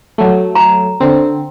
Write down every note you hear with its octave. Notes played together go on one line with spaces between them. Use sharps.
F#3 A3
A#5
D3 C4